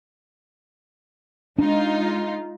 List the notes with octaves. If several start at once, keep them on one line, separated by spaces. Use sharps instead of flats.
G#3 D4 D#4 F4